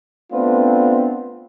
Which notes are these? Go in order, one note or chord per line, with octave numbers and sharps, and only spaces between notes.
A3 B3 C4 D4 F4 B4